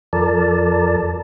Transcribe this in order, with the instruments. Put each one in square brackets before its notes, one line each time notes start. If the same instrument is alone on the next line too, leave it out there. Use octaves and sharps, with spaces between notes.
[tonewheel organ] F2 F3 A4 A#4 D5 A5